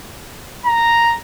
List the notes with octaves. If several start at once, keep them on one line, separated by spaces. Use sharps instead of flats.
A#5